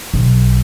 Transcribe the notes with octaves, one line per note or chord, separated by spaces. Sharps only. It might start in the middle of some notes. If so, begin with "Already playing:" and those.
B1